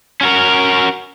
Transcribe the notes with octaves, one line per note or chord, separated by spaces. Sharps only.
C#4 F#4 A#4